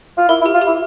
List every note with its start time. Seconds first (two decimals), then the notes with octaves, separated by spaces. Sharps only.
0.18 F4
0.29 E4 A#4
0.41 E4
0.46 G4
0.54 F4
0.61 G4
0.67 E4